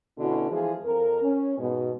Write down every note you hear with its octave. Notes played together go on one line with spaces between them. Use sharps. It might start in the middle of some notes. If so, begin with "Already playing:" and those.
B2 D3 B3 C#4 E4 F#4
E3 F3 G#3 F4 G#4
F2 A#4
C#4
G#2 B2